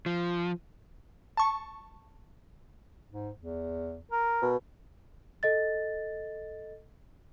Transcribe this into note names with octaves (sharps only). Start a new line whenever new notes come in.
F3
A5 C#6
G#2
E2
A#4
B2
A4 D#5 A6